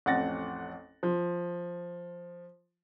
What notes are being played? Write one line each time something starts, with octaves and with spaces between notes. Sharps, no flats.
A1 F2 F#5 A6 A#6
F3